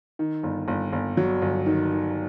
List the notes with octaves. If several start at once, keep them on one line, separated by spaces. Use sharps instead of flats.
D#3
G1
G1
G1
F#3
G1
D#3
D#3